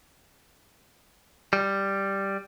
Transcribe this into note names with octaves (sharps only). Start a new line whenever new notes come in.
G3